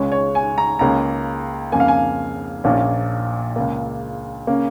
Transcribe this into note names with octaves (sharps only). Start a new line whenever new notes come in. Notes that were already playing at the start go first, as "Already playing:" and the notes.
Already playing: C#2 C#3 G#3 C#4 C#5
C#5
G#5
A#5
C#2 C#3 A#3 C#4 A#5
F2 C#3 A#3 G#5
F5
G#5
A#1 A#2 F3 A#3 C#4
C#2 C#3 A#3
C#3 A#3 C#4